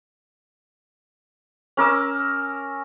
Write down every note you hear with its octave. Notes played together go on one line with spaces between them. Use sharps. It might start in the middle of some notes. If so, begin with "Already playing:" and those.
C#4 A#4 D6 E6